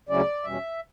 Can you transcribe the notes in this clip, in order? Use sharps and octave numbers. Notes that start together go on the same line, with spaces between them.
D2 C#3 F#3 C#4 E4 D5
E2 B2 G3 C#4 E5